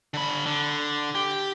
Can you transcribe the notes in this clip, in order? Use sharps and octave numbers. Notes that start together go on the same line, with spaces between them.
D3 B5
D3
G4